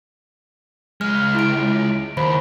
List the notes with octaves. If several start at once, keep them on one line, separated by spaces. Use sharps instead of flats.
C#2 G#3 F6
E4 D7
D#2 C5 B5